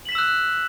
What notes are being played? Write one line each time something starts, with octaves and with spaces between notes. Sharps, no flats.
E6 F#6 B6 E7 F#7